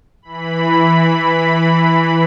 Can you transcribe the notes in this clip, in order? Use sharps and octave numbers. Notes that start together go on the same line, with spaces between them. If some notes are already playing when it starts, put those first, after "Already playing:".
E3 B5